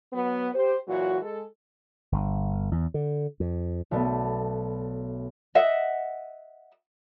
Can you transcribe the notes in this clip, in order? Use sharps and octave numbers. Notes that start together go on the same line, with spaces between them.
F#3 B3
G4 C5
A#2 E3 F#3 F#4
G#3 A4
G1
E2
D3
F2
B1 A3 B3 D5
D#5 E5 F#5